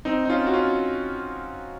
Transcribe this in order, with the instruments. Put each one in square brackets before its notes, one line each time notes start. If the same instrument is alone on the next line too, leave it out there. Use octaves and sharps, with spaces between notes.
[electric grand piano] C4 D#4
D#4
C#4 F4
F#4
C#4 F4